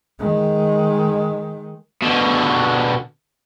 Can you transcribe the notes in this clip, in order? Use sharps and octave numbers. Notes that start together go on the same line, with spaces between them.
D#3 G#3
B2 D3